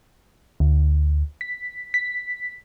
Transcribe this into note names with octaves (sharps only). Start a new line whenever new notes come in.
D2
B6
B6